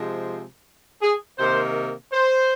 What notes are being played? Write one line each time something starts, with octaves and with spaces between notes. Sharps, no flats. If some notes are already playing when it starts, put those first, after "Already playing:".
Already playing: C3 F3 G#3
G#4
C3 D#3 A#3 C5
C5